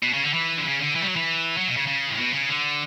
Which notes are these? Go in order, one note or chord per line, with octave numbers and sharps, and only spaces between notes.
B2
C#3
D3
E3
D3
C#3
D3
E3
G3
F#3
E3
F#3
B2
C#3
C#3
A2
B2
C#3
D3